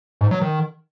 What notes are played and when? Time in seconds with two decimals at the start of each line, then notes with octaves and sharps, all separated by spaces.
0.21 G#2
0.31 F#3
0.41 D#3